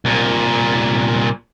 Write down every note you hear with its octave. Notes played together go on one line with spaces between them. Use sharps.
C2 A#2